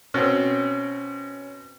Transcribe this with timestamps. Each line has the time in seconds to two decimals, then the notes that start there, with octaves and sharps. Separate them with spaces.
0.14 B2 C4 C#4